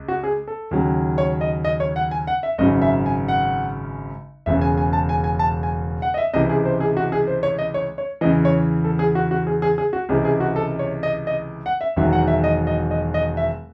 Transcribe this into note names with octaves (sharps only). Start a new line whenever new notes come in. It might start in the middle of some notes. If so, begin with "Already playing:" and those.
Already playing: C#2
F#4
G#4
A4
D#2 C#3 F#3
C#5
D#5
D#5
C#5
F#5
G#5
F#5
E5
G#1 F#2 C#3 F#3 D#5
E5
G#5
F#5
E1 E2 C#3 E5
G#5
G#5
A5
G#5
G#5
A5
G#5
F#5
D#5
E5
C#2 C3 E3 D#5
G#4
C5
G#4
F#4
G#4
C5
C#5
D#5
C#5
C#5
E2 C#3 E3 D#5
C#5
A4
G#4
F#4
F#4
G#4
G#4
G#4
F#4
C#2 C3 E3 G#4
G#4
F#4
A4
C#5
D#5
D#5
F#5
E5
E1 E2 D#3 F#3 E5
F#5
E5
D#5
D#5
D#5
D#5
E5